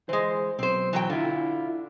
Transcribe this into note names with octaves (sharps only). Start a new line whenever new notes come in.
E3 G#3 C5
B1 C4 C5
E3 F#3 G5
D3 E4 F4